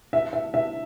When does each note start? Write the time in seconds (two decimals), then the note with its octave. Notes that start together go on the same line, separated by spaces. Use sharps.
0.13 E5
0.33 E5
0.54 E5